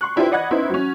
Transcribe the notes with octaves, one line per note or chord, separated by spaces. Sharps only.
C6 C#6 F#6
D4 E4 F4 G4 B4 C5
D5 D#5 F#5 B5 F#6 G#6
B3 C#4 D#4 E4 C5
F#3 C#4